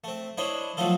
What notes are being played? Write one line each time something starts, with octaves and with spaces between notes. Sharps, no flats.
A3 C4
D4 E4 C5 C#5 D#5
F3 F#3 A3 D#4 F4 A4